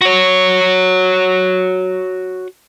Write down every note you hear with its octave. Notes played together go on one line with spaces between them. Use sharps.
F#4 C#5